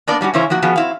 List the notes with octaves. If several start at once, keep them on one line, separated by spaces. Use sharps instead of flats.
A#3 B3 D4 A#4 D5
F#3 G3 C#4 F#4
C#3 E3 C#4 E4 C5 C#5
F3 A#3 F#4 F#5
F3 B3 C#4 F#4 G#4
C4 E4 F5